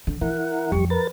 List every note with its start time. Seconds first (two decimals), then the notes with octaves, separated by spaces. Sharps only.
0.07 D3
0.21 E3 E4 A#4 F#5
0.72 F2 F#3 G3 G4 C#6
0.90 A#4 B4 A6